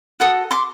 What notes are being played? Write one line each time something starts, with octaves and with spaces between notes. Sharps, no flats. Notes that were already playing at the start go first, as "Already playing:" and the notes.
F#4 A4 D#6
C6 D6